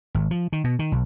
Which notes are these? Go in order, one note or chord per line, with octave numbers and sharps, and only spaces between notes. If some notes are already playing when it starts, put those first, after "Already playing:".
G#1
F3
D#3
B2
D#3
B1